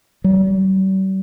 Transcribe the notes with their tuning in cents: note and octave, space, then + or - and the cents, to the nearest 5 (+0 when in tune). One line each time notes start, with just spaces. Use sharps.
G3 -45